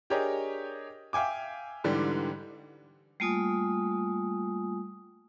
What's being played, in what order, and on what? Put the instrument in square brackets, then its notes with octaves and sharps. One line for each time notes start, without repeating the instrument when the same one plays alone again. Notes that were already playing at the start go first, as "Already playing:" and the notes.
[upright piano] D4 G4 G#4 A#4 C#5 D#5
E5 F5 G5 G#5 D6
G#2 D3 E3 G3
[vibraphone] G3 A3 A#3 F4 G#5 D#6